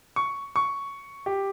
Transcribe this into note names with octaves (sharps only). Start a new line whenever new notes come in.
C#6
C#6
G4